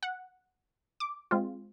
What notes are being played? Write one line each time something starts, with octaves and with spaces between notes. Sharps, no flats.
F#5
D6
G#3 C4 F4